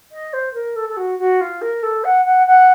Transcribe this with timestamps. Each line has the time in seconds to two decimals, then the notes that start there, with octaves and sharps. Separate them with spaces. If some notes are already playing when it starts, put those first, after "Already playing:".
0.11 D#5
0.33 C5
0.54 A#4
0.76 A4
0.89 A4
0.97 F#4
1.18 F#4
1.41 F4
1.61 A#4
1.83 A4
2.04 F#5
2.25 F#5
2.47 F#5